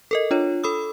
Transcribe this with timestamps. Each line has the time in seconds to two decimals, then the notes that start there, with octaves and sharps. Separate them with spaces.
0.11 A4 A#4 D#5
0.31 D4 F4 C#5
0.64 A4 B5 D#6 E6